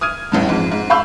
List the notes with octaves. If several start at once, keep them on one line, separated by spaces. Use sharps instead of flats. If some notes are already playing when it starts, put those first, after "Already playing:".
D#6 F6 G#6 D#7
A1 E2 G2
F2 G#2
G#2
F5 B5 C#6 E6 G6